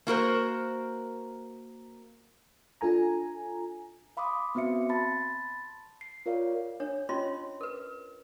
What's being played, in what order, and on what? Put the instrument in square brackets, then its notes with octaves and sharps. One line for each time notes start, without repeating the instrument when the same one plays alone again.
[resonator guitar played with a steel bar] A#3 F#4 A#4 C5
[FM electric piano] D4 F4 A4 G#5 A#5
[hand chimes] F5 B5 C6 D6 D#6
B3 C4 F#4 E5 C#7
A5 B5 C6 A6
C7
F4 A#4 C#5 D5 F5
[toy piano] D4 C#5
C#4 E4 F4 C#5 D#5 C6
A#4 B4